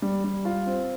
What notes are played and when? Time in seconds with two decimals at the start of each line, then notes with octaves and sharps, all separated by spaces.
0.02 G3
0.24 G3
0.45 F4
0.67 C4